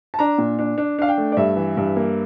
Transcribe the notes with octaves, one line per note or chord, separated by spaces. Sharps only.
A5
D4 A#5
A#2
D4
D4
D4 F5
G5
A3
D5
G2 E5
E3
G2
A#3